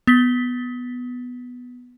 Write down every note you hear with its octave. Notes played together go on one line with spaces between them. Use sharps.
B3 B6 G7